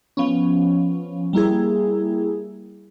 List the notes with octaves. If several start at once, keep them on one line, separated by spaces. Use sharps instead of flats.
F3 B3 C#4
G3 A#3 E4 G#4